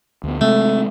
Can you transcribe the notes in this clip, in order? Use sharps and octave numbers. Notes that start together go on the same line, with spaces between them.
D2 B3
C3 G#3 A3 C4